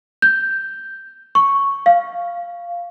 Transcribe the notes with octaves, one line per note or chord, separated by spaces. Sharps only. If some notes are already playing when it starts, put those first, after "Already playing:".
G6
C#6
F5